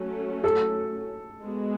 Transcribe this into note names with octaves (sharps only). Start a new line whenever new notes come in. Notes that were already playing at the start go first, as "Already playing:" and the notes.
Already playing: F#3 A3 C#4
A4
G#3 B3 F#4